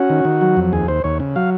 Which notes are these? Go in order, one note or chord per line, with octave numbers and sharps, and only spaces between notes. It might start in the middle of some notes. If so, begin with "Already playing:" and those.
Already playing: C#4 F#4
D#3
D#3
F#3
F2
D#2 G#4
D#2 C5
D#2 C#5
C#3
F#3 F5